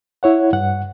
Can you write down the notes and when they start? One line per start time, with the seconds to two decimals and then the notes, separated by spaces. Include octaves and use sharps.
0.23 E4 C#5 F#5
0.53 G2 F#5